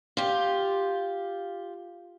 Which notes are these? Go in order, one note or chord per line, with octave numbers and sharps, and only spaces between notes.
F4 G4